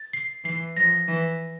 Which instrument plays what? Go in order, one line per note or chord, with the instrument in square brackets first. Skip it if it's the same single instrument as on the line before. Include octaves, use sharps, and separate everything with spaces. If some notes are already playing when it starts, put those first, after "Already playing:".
Already playing: [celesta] A6
C7
[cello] E3 [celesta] C7
[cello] F3 [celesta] A#6
[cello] E3